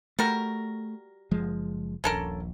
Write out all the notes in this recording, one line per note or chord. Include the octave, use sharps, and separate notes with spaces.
G3 A3 F#4 A#4
F#1 F3 G#3
D#1 A#1 C#4 A4 A#4